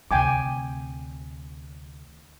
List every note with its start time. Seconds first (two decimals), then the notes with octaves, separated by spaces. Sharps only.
0.11 D2 C3 G5 G#5 D6